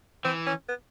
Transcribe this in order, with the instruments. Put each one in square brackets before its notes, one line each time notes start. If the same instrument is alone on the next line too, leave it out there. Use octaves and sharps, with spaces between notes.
[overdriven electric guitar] E3 [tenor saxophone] C4
[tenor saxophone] C#4
B3